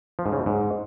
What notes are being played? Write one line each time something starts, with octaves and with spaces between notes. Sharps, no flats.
F3
G#2
C#3
B2
G#2